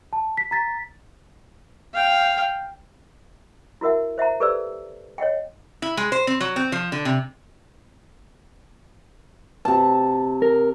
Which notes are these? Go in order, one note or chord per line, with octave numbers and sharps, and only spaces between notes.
A5
B6
A#5 A6 B6
F5 G5
E4 F#4 A#4 E5 F#5
C5 E5 F#5 A#5
G4 A4 B4 C5 D5 E6
C#5 D#5 F#5 G5
E4
G#3
C5
C4
F#3
C4
F3
D3
C3
C3 A5
A#4